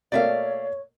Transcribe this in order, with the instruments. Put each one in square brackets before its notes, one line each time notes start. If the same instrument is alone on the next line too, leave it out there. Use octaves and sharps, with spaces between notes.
[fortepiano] B2 A3 A#3 [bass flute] C#5 [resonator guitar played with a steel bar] D5 E5 F5